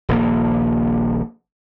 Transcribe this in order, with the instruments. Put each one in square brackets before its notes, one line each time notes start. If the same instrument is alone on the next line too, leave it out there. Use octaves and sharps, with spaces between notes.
[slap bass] D#1 A#1 A#3